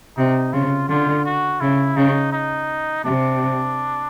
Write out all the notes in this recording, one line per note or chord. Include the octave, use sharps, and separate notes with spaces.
C3 D#4
C#3 F4
D3 F4
F#4
C#3 E4
C#3 D#4
D#4
C3 D4